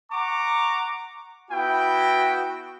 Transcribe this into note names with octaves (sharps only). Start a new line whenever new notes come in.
F#5 A#5 C#6 D6
B3 E4 F#4 G5